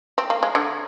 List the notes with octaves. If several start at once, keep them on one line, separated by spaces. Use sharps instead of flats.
C4
A#3
G#3
D3